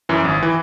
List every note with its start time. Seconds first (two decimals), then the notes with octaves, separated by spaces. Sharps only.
0.09 F#2 E3
0.25 G#1
0.43 E3